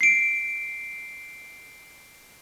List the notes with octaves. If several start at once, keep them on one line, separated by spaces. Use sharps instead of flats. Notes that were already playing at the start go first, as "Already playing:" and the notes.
C7 D7